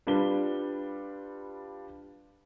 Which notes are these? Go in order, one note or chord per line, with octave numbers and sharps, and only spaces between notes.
G3 D4 F4 B4 G7